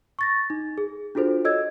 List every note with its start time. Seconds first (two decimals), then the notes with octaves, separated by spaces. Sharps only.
0.19 C#6 A6 A#6
0.50 D#4
0.78 G#4
1.15 D4 F4 F#4 A4 C5
1.45 A4 C#5 D#5 E6 G#6